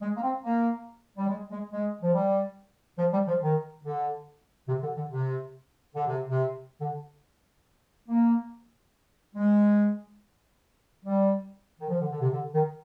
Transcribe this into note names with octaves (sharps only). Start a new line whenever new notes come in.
G#3
A#3
C4
A#3
G3
G#3
G#3
G#3
F3
G3
F3
G3
F3
D#3
D3
C3
D3
D3
C3
D3
C3
C3
D3
A#3
G#3
G3
D#3
F3
D3
D3
C3
D3
D#3